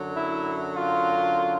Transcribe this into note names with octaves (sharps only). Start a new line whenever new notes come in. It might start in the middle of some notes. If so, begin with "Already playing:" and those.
Already playing: F#2 D3 F#3
E4
F4